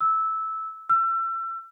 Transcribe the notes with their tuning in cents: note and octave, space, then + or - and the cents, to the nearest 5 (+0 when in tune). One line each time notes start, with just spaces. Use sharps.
E6 -15
E6 +35